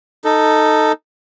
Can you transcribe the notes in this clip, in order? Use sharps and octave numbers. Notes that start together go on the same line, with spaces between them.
D#4 A4